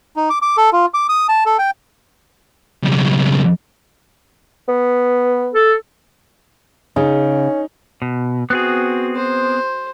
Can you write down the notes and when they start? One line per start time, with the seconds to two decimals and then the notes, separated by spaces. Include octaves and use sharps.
0.16 D#4
0.30 D6
0.42 D6
0.57 A4
0.73 F4
0.94 D6
1.09 D#6
1.29 A5
1.46 A4
1.58 G5
2.83 B1 C#3
4.68 B3
5.54 A4
6.96 C#3 C#4 D#4
8.02 B2
8.50 B3 C4 F#4 G#4
9.16 C5